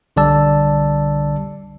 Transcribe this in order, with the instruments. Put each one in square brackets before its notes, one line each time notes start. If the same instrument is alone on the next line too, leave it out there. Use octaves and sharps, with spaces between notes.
[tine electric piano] B1 D3 G3 D5 A5 E6